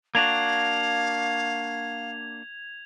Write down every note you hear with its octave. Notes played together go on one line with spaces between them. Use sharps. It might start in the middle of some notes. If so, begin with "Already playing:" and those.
A#3 D4 F#4 F5 G#6 F7